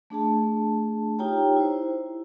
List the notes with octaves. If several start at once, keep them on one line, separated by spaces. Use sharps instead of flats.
A3 D4 G#4 A5
D#4 F4 G4 C#5 G5 A#5
E4 C5